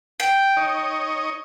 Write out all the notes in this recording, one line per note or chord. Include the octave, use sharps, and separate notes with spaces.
G5
D#4 C#5 D#5